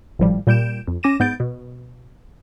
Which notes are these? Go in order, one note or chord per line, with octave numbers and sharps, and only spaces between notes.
G#1 A2 F3 G3
A#2 G3 G6 D7 E7
F2
C#4 D6 A#6 D#7 E7
G#2 B3 G6 A6 D7
B2